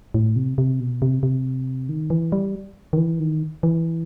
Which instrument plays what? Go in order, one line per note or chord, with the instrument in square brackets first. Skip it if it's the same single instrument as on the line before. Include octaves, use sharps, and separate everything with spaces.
[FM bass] A2
C3
C3
B2
C3
C3
D#3
E3
G3
D#3
E3
D#3
E3